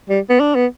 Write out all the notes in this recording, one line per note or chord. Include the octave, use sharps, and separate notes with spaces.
G3
B3
D4
B3